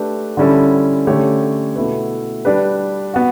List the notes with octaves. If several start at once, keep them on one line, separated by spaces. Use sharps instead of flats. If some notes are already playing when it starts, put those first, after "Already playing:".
Already playing: A3 D4 G4 B4
D3 G3 C#4 E4 A4
D3 A3 C#4 G4 C#5
B2 A3 E4 B4
G3 D4 G4 B4
B3 F#4